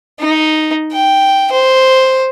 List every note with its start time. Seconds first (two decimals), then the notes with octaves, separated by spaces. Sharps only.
0.20 D#4
0.93 G5
1.52 C5